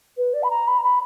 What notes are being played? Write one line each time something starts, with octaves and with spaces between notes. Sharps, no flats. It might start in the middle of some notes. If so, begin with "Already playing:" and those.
B4
D5
B5
A#5
B5
A#5
B5